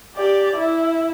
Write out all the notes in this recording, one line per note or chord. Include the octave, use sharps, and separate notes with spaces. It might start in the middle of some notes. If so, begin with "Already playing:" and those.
G4 D5
E4